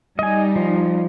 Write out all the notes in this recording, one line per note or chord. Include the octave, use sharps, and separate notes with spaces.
G3 D#4 D#5 G#5
F3